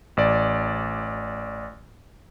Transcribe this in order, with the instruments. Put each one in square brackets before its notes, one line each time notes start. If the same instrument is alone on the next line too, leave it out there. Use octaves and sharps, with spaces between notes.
[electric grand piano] A1 D5